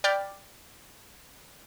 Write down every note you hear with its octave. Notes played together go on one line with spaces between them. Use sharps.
D5 G5 B5 F6 G6 A6